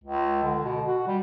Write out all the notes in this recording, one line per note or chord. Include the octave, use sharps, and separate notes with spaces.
C#2
D3
B2
F#4
G3